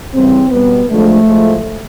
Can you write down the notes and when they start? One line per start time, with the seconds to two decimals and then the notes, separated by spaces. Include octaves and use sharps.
0.14 C#3 E3 G3 C4
0.51 B2 G3 B3
0.89 D3 F3 G#3 A3
1.26 A2 F3 G#3